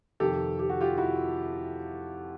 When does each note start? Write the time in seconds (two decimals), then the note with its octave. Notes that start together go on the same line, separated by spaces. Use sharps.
0.20 F2 C3 D#3 G4 A4
0.59 G4
0.70 F#4
0.81 F4 G4
0.98 E4 F#4